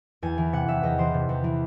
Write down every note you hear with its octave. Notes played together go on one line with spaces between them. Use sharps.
E2 G#5
E3
C3 F#5
E2 E5
E2 D#5
E3 C5
C3
E2
E3